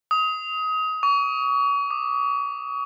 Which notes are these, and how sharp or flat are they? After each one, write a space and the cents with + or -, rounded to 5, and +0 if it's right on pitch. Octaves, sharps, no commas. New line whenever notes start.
D#6 +25
C#6 +40
D6 +25